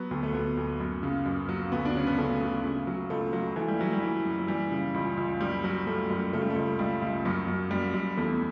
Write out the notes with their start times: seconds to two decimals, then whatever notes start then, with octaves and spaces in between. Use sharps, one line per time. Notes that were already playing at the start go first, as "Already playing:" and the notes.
Already playing: F#3 B3
0.11 D2
0.23 A3
0.34 D2 B3
0.57 D2
0.80 F#2
1.03 C#3
1.26 F#2
1.49 F#3
1.72 D2 B3
1.85 D4
1.95 C#3 C#4
2.07 B3
2.18 C#3 A3
2.41 C#3
2.64 C#3
2.87 F#3
3.10 C#2 A3
3.33 F#3
3.56 E3 A3
3.68 G3
3.79 E3 F#3
3.93 G3
4.02 E3
4.25 F#2
4.39 F#3
4.48 E3 G3
4.71 C#3
4.94 C#2
5.17 C#2
5.40 F#2 G3
5.64 F#3
5.87 F#2 A3
6.10 F#2
6.33 C#3 A3
6.42 G3
6.50 A3
6.56 C#2
6.79 C#2 G3
7.02 C#2
7.25 F#2 F#3
7.48 F#2
7.71 F#2 G3
7.94 F#2
8.17 E2 A3